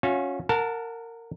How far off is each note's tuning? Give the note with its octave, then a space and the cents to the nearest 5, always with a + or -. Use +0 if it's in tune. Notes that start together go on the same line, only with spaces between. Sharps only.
C#4 +0 F#4 -40 F5 -35
A#4 -20 F#5 -25 A5 +10